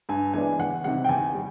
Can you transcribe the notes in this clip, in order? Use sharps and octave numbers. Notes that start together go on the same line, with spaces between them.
G2 G#5
E3 G#3 B3 D4 G#5
E2 F#5
C3 D#3 G3 F#5
G5
E2 G#5
G3